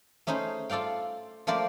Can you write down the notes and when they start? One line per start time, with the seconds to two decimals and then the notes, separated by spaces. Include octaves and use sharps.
0.27 A3 C#4 D#4 G#4 C5
0.69 F4 A4 D5 F5 G5
1.47 F3 A3 A#3 A#4 C5 D5